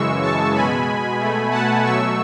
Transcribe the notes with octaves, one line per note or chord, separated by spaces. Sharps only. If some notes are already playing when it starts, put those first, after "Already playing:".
Already playing: F#2 C#3 E3 G#3 C#6 E6
A5 C#6
B2 G#3 G#5 B5
B2 A3
F#5 A5
B2 F#3 A3 C#6 E6